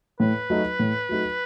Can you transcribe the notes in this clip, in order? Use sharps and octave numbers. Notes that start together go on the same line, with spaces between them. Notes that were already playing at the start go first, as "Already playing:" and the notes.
A2 B4
F#3 A3 D#4 F#4
A2
F#3 A3 D#4 F#4